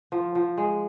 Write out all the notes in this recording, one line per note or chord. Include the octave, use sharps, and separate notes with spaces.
F3
F3
G#3